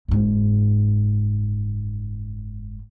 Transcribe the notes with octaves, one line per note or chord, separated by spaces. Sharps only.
F#1 G#2